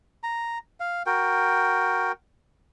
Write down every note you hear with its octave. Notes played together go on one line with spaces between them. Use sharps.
A#5
F5
F#4 A#4 G5